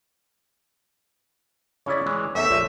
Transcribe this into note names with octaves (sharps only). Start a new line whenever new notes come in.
C#3 C#4 E4 C#5 D5
E3 G#3
E2 A3 D#4 E5
A#1 F3 D#5